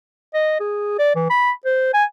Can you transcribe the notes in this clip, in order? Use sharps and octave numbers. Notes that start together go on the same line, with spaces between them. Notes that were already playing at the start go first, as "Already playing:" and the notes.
D#5
G#4
D5
E3
B5
C5
G#5